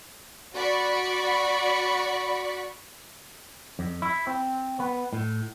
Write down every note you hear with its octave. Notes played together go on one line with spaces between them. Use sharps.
F#4 D5 B5 C#6
F2
E4
C4
B3
A2